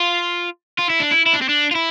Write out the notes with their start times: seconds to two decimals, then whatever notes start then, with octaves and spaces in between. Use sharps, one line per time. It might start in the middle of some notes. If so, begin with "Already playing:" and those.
Already playing: F4
0.78 F4
0.89 E4
1.00 D4
1.11 E4
1.26 E4
1.34 D4
1.42 C4
1.49 D4
1.71 F4
1.75 E4